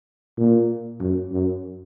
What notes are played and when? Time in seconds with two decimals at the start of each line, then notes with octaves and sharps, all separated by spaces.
0.38 A#2
1.00 F#2
1.32 F#2